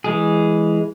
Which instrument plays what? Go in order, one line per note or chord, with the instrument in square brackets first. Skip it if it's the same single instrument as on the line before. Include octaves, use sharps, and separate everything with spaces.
[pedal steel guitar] E3 G#3 G#4